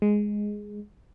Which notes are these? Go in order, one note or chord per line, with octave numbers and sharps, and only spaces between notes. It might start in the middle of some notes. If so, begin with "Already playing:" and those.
G#3